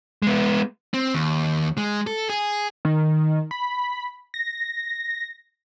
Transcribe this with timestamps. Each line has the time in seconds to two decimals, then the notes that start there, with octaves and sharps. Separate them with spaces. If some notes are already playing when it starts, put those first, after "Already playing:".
0.22 G#3 B3
0.94 C4
1.15 D#2
1.78 G#3
2.07 A4
2.30 G#4
2.85 D#3
3.51 B5
4.34 A#6